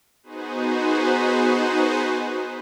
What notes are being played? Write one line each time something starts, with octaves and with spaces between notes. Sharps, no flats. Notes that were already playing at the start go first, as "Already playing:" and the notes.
B3 D#4 F#4 G#4 B4 C5